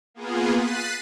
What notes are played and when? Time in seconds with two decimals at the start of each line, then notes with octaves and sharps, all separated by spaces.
0.14 A#3 B3 F4 G#4
0.52 F#6 A6 B6 C7 D#7